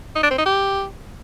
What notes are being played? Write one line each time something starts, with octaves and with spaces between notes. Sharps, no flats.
D#4
D4
C4
D#4
G4